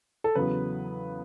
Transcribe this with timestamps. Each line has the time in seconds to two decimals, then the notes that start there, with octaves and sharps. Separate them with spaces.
0.24 A4
0.35 E2 C#3 F#3 B3 B4